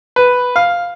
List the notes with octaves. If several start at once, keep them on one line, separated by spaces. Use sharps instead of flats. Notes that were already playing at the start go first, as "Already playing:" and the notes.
B4
F5